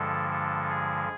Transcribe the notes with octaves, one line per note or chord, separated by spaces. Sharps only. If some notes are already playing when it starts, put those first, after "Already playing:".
Already playing: G2 D3 F3 G#3 A4
A4
G#4